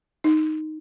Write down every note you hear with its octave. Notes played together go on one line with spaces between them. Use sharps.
D#4